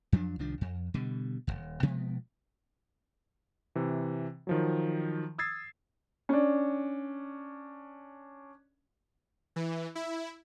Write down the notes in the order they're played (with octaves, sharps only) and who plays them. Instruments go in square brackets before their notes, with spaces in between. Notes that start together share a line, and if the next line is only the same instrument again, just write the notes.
[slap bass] F2 F3 F#3 D4
C2 D#3 F3 D4
F2
B2 D3 G3
D#1 D#2
B2 F3 G#3 B3
[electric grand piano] C3 E3
D#3 F3 F#3
D#6 E6 G#6 A6 C7
[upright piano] C#4 D4
[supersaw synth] E3
E4